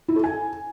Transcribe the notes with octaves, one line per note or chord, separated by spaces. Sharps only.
E4
A4
G#5